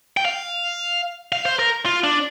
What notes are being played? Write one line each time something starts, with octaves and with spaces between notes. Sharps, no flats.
G5
F5
F5
C5
A#4
F4
D4